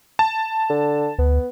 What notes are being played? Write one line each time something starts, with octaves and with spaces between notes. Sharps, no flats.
A5
D3
D2 B3